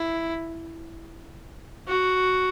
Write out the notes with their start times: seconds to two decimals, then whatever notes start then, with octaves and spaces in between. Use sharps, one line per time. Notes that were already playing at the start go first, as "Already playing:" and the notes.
Already playing: E4
1.88 F#4